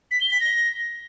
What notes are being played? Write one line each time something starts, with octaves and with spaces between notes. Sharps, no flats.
B6
G7
B6
A#6